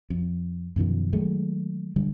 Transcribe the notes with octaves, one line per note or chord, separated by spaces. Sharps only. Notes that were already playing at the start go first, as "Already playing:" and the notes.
F2
F#2 B2 D#3 F3
D#3 F#3 G#3 A3
D3 G3